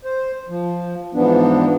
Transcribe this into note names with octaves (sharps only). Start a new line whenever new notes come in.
C5
F3
G#2 E3 F3 B3 D4